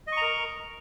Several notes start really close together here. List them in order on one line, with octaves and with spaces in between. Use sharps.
D#5 C#6 A#5 A#4